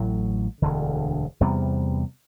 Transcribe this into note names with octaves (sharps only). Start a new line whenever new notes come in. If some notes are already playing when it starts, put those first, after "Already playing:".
Already playing: A1 A2 F#3
E1 D2 D3
E2 C3 G3 B3